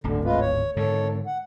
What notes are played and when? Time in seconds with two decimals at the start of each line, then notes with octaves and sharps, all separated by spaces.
0.04 D1 G#1 D2 D3
0.25 G#3 F4 B4
0.41 C#5
0.76 G#2 D3 D#3 A4 C#5
1.26 F#5